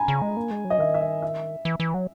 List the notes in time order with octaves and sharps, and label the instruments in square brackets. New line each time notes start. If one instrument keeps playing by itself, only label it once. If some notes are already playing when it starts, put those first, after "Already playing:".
Already playing: [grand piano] G#5 A#5 B5
[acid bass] C#3
G#3
A#3
G#3
F#3
[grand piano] D#5
[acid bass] D#3 [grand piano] E5
[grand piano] E5
D#5
E5
[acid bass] E3
E3
F#3